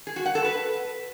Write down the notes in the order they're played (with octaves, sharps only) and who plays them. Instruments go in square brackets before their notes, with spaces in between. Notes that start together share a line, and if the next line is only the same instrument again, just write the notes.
[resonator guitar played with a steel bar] G#4
F#4
F#5
A4
B4